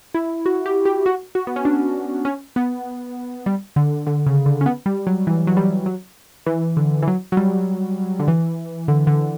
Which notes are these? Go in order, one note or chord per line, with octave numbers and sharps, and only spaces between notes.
E4
F#4
G4
G4
F#4
F#4
B3
C#4
D4
C#4
B3
G3
D3
D3
C#3
D3
C#4
B3
G3
F#3
E3
F#3
G3
F#3
E3
D3
E3
F#3
F#3
G3
D3
E3
D3
D3